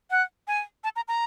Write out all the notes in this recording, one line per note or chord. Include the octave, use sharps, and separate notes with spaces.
F#5
G#5
A5
A#5
A#5